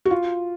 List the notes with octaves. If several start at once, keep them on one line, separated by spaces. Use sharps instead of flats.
F#4
F4